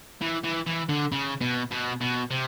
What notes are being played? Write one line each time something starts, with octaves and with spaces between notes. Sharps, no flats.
E3
E3
E3
D3
C#3
B2
B2
B2
C3